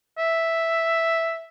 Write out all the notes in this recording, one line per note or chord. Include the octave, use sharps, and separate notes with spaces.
E5